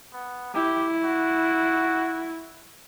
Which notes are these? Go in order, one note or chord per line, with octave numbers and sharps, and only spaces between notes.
B3
E4 G4
F#4